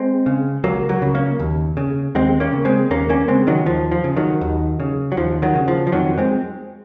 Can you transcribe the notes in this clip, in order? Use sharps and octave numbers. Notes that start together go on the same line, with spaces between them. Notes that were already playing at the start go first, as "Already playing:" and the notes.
Already playing: G#3 C4
C#3
C#2 F#3 A#3
F#3 A#3
C#3
A#3 C#4
D#2
C#3
D#2 G#3 C4
A#3 C#4
C#3
G#3 C4
D#2 A#3 C#4
A#3 C#4
C#3 G#3 C4
D#3 F#3
D#2 F3
F3
C#3
D#3 F#3
D#2
C#3
F#3
D#2 F3
D#3 F#3
C#3
F3
F3
F2 D#3 F#3
G#3 C4